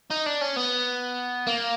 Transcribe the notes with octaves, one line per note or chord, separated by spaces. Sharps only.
D#4
D4
C#4
B3
A#3